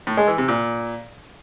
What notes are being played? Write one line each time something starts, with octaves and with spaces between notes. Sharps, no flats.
A2
G#3
E3
C3
A#2